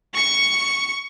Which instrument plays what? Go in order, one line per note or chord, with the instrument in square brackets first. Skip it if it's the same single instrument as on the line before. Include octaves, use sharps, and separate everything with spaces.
[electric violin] C#6 C#7